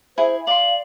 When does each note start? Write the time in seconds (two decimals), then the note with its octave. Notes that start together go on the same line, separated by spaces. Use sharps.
0.18 E4 G#4 C5
0.47 D5 F5 C6 F#7